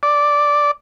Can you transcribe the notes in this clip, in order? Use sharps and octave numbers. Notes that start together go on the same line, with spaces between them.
D5